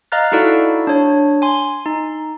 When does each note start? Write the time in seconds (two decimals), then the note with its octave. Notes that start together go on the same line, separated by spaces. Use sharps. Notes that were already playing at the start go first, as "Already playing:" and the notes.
0.12 D#5 F5 A#5 F6 F#6 A6
0.32 D#4 E4 F#4 A4 D5 F5
0.87 D4 C#5
1.42 G#5 C6
1.86 D#4